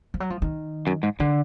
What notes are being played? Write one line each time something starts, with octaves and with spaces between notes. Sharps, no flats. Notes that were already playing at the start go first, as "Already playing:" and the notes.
F3
F#3
F3
D#3
F#2
G#2
D3 D#3